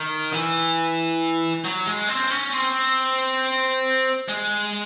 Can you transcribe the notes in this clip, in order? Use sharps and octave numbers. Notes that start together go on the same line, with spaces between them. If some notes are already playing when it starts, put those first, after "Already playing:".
Already playing: D#3
E3
F#3
G#3
C4
C#4
C4
G#3